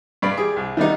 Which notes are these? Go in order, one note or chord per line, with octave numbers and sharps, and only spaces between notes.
G2 D5 B5
G4 G#4
C2
D#3 G3 B3 D#4